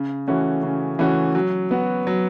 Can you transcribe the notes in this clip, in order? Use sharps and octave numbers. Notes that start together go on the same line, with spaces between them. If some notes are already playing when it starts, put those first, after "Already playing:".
Already playing: C#3
E3 A3 C#4 F#4
C#3
E3 A3 C#4 F#4
F#3
B3 F#4
F#3